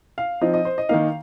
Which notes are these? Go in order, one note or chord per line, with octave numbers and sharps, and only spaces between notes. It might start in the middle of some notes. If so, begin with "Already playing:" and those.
F5
F3 C4 D#4 D#5
D#5
C5
D#5
D#3 A#3 D#4 F5